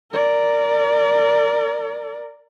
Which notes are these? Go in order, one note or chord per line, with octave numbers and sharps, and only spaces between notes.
A#4 D5